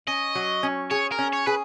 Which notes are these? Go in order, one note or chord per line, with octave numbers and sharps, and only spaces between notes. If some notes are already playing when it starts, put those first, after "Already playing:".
C#4 D#5
F#3
C#4
G#4 C#5
A#4
C#4
C#5
G#4 B4